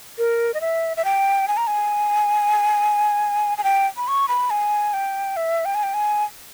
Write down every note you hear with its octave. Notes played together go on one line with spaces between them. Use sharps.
A#4
D#5
E5
E5
G5
G#5
A#5
G#5
G#5
G5
B5
C#6
B5
G#5
G5
E5
G5
G#5
G5
G#5